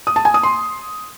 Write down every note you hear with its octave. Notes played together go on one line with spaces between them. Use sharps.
D#6
A5
G#5
D#6
C6